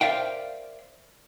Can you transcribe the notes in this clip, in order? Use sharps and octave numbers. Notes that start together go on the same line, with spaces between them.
A#4 C5 D5 E5 F5 G5